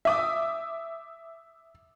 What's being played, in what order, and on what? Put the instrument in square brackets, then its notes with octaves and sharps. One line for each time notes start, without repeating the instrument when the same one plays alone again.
[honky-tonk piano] E5 D6 D#6